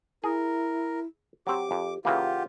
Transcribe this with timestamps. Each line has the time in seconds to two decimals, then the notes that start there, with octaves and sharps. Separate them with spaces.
0.24 E4 G#4 A#4
1.47 F#3 C4 G4 D6
1.71 F2
2.05 C#3 E3 A#3 F4 G4 F#5